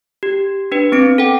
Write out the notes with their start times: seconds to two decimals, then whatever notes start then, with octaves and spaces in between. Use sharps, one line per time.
0.23 G4
0.72 D4 B4
0.92 B3 C4 D7
1.18 A4 F#5 G5